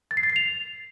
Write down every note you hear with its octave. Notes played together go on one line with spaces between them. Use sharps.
A6
C7
A6
C7
F7